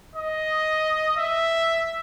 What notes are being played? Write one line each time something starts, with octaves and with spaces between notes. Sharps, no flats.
D#5
E5